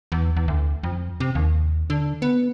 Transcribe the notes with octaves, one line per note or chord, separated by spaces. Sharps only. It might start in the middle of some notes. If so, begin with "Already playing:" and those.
E2
E2
D2
F2
C3
D#2
D3
B3